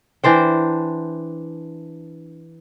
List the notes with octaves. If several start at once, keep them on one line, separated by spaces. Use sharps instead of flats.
E3 D4 C5 G5